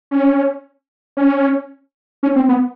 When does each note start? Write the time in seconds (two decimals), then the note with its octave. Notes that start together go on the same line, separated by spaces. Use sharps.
0.11 C#4
1.17 C#4
2.23 C#4
2.36 C4
2.49 B3